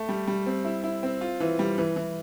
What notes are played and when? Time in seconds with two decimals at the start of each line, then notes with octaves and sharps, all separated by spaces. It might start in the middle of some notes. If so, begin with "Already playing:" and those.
Already playing: A3
0.09 G3
0.27 G3
0.46 C4
0.65 E4
0.84 E4
1.03 C4
1.21 F4
1.40 E3
1.59 G3
1.78 E3
1.96 E3